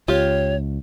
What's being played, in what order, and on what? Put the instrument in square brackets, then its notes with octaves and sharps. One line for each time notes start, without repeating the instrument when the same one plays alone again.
[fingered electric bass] C#2 [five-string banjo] F4 G4 [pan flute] C#5